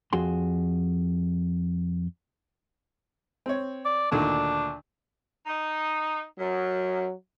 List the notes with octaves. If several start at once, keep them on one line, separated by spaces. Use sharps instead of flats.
F2 F#4 G#4 C6
C4 C#5
D5
D2 A#2 D#3 D4
D#4
F#2 F#3